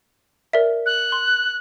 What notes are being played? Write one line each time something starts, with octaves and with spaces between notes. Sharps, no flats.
A#4 D5 E5
F#6
C6